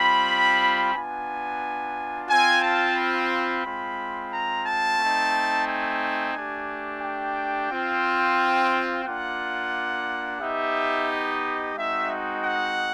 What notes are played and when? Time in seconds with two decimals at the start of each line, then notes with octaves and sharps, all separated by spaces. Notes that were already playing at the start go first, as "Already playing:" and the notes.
Already playing: G3 C4 F4 B5
0.94 B3 D4 F4 G#5
2.29 C4 F4 G#5
2.63 A5
2.96 B5
3.64 G#3 C4 F4
4.31 A#5
4.66 A5
4.99 A3 C4 D#4
5.67 G#5
6.34 A3 D4 G4
7.02 G5
7.70 C4 F4
9.05 A#3 D4 F4 F#5
10.40 B3 D#4 G4 E5
11.08 D#5
11.75 G#3 C4 D#4 F#4 E5
12.42 F#5